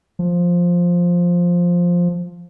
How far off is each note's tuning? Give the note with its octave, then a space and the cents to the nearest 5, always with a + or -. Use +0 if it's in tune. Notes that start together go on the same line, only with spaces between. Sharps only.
F3 +5